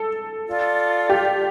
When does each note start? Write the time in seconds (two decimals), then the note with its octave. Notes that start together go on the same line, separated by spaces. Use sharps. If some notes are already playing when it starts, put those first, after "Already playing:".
Already playing: A4
0.47 F4 A4 D5
1.09 G4